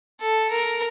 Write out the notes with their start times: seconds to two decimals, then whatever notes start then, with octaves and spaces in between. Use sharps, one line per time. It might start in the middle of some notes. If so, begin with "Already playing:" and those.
0.20 A4
0.51 A#4